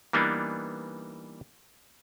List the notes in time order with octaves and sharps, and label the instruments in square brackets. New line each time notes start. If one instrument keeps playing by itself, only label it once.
[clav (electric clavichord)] E3 G3 A#3 B3 D4 D#4